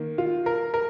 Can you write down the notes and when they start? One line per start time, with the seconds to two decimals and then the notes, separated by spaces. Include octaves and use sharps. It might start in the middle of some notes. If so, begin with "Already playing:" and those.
Already playing: D#3 A#3
0.18 F4
0.46 A#4
0.74 A#4